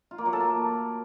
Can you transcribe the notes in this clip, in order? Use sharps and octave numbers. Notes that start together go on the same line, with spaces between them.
F4
A#3
F#3
A4
A#3